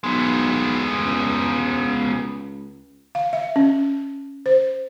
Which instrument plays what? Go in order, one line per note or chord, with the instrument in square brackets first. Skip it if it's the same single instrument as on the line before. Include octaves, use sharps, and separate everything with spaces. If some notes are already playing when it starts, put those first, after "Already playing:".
[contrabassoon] B1 [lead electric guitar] G#3 B3
[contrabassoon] C#2
[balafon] F5
E5
C#4
C5